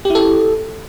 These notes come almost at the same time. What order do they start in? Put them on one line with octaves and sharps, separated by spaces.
G4 E4 A4